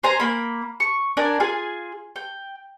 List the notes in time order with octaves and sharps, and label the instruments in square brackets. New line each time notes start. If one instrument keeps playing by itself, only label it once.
[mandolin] C5 G#5 A#5
A#3 A#4 B5
C#6
D4 A#4 D5 G#5
F4 G#4 G#5
G5